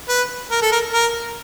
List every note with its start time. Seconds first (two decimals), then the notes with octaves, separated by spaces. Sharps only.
0.09 B4
0.51 A#4
0.62 A4
0.72 A#4
0.93 A#4